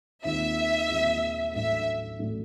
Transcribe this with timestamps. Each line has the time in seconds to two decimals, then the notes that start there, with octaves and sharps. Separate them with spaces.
0.24 D#2 D#3 G#3 C4 F4 E5
0.89 D#2 D#3 G#3 C4 F4
1.54 A1 A2 F#3 A3 D4 E5
2.19 A1 A2 F#3 A3 D4